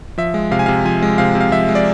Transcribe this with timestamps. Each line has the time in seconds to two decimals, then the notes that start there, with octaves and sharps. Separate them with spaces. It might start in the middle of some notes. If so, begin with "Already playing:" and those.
0.18 F3 E5
0.34 G#3
0.51 C3 F5
0.59 G#5
0.66 C3 F5
0.85 F3 G#5
1.02 G#3
1.18 C3 F5
1.35 C3
1.41 F5
1.52 F3 E5
1.69 G#3
1.75 D5